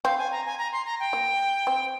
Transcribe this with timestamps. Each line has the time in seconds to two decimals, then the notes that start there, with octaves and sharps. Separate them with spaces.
0.05 C4 F5
0.18 G#5
0.32 A#5
0.46 G#5
0.58 A#5
0.73 C6
0.86 A#5
1.00 G5
1.13 A#3
1.67 C4